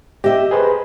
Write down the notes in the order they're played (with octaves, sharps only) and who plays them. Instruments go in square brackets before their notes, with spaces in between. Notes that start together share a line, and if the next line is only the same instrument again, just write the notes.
[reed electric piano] G4 [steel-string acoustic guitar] D#5 E5
[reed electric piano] G#4 B4 C5